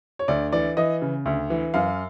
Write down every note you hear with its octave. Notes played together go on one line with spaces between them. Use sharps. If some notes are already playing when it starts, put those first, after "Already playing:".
C#5
D2 D5
E3 D5
E3 D#5
C#3
D2
E3
F#2 F5